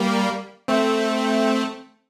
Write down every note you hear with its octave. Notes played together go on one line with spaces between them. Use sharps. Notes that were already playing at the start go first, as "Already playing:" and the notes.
Already playing: G3 A#3
A3 C4